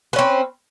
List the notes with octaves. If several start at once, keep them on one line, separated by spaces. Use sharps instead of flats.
C4 C#4 B4